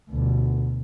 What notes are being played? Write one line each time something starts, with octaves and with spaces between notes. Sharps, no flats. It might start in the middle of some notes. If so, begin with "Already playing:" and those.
D2 B2